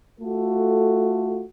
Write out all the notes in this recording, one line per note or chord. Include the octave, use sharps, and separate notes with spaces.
A3 F4 F#4 A4